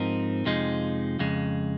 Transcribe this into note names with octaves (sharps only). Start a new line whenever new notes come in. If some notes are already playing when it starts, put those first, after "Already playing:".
Already playing: G#2 F3 C4 D#4 A#4
F2 C3 F3 G#3 D#4
F2 C#3 G#3